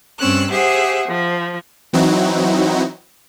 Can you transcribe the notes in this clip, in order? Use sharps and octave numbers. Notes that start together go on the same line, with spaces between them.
G2 C4 C#4 E6 F#6
G4 G#4 C5 E5 F#5
F3
E3 F#3 C4 D#4 E4 F#4